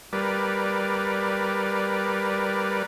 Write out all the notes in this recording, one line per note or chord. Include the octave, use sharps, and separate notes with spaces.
G3 A#4 B4 D5